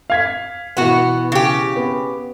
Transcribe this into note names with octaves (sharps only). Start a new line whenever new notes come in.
F5 G#6 B6
B2 E3 B3 F#4
C#3 G4
B3